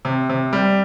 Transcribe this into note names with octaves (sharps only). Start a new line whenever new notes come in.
C3
C3
G3